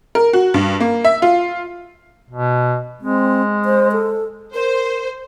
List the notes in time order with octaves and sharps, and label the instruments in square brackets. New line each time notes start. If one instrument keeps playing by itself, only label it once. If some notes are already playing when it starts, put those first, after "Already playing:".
[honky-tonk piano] A#4
F#4
G2
A#3
E5
F4
[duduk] B2
[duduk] G#3 [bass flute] C4
[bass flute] C5
A4
[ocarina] A#4 [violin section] C5